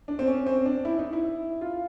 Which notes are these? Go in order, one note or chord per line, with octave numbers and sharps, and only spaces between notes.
D4
C4
C#4
C4
D4
E4
D#4
E4
F4